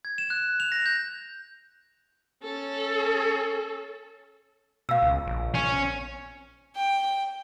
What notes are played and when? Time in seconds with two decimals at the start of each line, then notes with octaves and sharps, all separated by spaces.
0.05 G#6
0.18 E7
0.30 F#6
0.60 F7
0.72 A#6
0.86 G6
2.43 C#4 A4
4.89 B2 F5 E6
5.03 C#2
5.27 A#1
5.55 C#4
6.76 G5